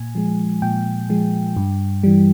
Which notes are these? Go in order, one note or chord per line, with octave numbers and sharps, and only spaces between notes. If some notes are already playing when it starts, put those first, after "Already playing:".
Already playing: A#2 G#5
F3 G#3
A#2 G5
F3 G#3
G2
E3 G3